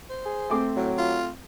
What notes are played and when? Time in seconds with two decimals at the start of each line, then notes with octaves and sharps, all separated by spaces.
0.10 C5
0.26 G#4
0.50 A3 C4 D6
0.76 A2 F#3
0.98 F4